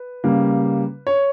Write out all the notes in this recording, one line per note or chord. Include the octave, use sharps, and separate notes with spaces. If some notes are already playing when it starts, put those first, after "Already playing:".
Already playing: B4
C#3 G3 A#3
C#5